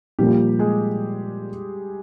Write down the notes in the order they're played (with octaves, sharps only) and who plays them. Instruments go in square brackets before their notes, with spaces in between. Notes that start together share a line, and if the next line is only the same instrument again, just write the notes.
[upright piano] A#2 F3 A#3 [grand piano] G3 G4
[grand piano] G#3 G#4